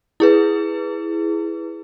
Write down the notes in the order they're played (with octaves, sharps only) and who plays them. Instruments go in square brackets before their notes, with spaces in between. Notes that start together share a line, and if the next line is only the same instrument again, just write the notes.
[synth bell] E4 G#4 B4